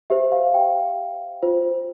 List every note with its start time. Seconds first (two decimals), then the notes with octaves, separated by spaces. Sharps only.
0.10 G4 C5 E5
0.32 F5
0.54 G5
1.43 F4 C5